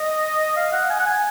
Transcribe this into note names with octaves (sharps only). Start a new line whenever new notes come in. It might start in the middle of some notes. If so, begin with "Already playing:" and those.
Already playing: D#5
F5
F#5
G#5
F#5
G#5